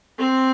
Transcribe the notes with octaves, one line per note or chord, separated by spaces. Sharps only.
C4